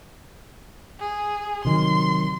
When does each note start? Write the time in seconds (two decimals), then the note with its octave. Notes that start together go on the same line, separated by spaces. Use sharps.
1.00 G#4
1.65 C3 D#3 F#3 C6